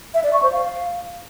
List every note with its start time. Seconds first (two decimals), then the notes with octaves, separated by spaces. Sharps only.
0.14 E5
0.24 D5
0.33 C#6
0.43 C5
0.52 F5